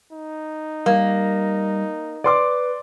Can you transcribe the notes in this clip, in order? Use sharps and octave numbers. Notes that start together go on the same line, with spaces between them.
D#4
G3 A#3
B4 D5 C6 D6